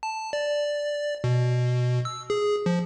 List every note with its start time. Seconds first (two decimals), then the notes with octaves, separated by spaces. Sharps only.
0.03 A5
0.33 D5
1.24 B2
2.05 E6
2.30 G#4
2.66 F3